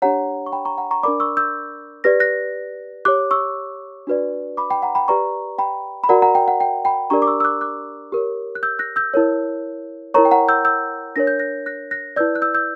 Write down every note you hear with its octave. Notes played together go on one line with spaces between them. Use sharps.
D4 G4 C#5 F#5 A#5
C#6
G5 B5
A#5 C#6
F#5 A#5
A#5 C#6
D4 A#4 D5 B5 D6
C#6 E6
E6 G6
G4 B4 D5 A#6
F#6 A#6
G4 C#5 D6 F#6
C#6 E6
D4 F#4 B4 D5
B5 D6
G5 B5
F#5 A#5
G5 B5
G4 B4 D5 A#5 C#6
G5 B5
B5
F#4 A#4 D5 F#5 A#5
F#5 A#5
G5
F#5
G5
G5 B5
D4 G4 A#4 D5 A#5 C#6
D6
C#6 E6
E6
D6 F#6
D6 F#6
G4 A#4 C#5
F#6
E6 G6
F#6 A#6
E6 G6
E4 A#4 C#5
E4 A#4 C#5 A#5 C#6
G5
F#5 A#5
E6 G6
E6 G6
D4 A#4 C#5 A#6
G6
F#6 A#6
F#6 A#6
F#6 A#6
E4 B4 D5 E6 G6
F#6
E6 G6
E6 G6